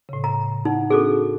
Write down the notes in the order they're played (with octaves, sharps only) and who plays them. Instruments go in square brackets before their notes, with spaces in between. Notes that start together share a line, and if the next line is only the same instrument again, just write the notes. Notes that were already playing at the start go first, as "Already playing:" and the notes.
[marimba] A2 C#3
[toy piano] A#5
[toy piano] D#4 [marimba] F#5
[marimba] C4 D4 F#4 [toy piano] G#4 A4